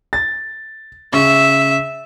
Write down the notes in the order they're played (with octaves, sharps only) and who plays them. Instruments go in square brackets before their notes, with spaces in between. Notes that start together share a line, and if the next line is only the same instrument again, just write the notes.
[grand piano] A6
[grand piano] C#3 C#6 [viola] E5